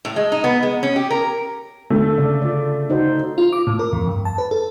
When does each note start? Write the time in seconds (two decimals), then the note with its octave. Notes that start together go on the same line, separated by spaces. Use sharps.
0.05 A2
0.16 G#3
0.32 D#4
0.44 B3
0.63 G#3
0.83 C#4
0.96 G4
1.11 A#4
1.90 D3 A3 A4
2.18 C#3 D5 F5
2.42 F4 D5
2.90 D#4 F#4 C5
3.38 F4
3.53 D6
3.67 A2
3.79 A#4
3.93 F2
4.08 G2
4.25 A5
4.38 B4
4.51 A4